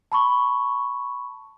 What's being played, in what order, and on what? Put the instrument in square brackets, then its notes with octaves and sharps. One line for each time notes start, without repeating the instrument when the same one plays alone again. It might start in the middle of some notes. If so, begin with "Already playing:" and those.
[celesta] A5 B5 C#6